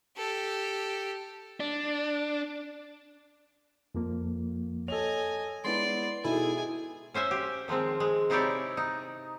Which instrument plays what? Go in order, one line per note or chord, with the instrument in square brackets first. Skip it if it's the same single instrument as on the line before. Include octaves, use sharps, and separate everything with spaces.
[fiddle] G4 A4
[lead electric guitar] D4
[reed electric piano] F2 F3 A#3
[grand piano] A4 F7 [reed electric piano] C#5 [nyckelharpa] D#5 G#5
[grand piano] G#3 B3 E4 [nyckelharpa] D5 [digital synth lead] C6
[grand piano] B2 D#4 [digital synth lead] E4 [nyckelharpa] G#4 G#5 [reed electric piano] A4
[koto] C#4 C5 E5 G#5
G4
D#3 F3 G#3 C4
G#3
C3 D#4 E4 G4 C#5 D5
D#4